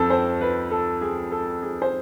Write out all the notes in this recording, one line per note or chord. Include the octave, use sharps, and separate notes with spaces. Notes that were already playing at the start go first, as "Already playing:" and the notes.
Already playing: F2 C4 A4
C5
B4
A4
G#4
A4
G#4
C5